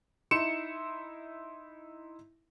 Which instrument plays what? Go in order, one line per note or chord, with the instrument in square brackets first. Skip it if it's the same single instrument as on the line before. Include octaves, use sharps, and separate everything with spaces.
[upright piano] D#4 E4 C6 C#7 E7